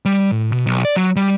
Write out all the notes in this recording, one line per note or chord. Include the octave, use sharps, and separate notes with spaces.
G3
A2
B2
B1
D5
F#3
G3